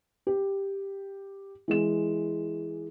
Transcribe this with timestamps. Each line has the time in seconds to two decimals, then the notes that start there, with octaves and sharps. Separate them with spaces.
0.27 G4
1.68 E3 G#3 E7